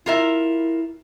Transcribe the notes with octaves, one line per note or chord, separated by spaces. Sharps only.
E4 F4 A#4 E5